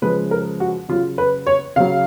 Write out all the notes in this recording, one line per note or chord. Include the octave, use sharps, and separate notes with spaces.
C#3 F3 G#3 B4
A#4
F#4
C#3 F#3 F4
B4
C#5
C#3 F#3 F5